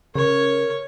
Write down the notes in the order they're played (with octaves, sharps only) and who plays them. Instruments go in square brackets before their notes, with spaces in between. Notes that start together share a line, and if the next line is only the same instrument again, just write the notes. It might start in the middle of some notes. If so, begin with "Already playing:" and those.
[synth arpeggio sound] C#3 [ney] A#4 [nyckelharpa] C#5